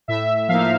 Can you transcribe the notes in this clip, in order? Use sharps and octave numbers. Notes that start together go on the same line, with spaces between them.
A2 E5
F3 A#3 D#4 F5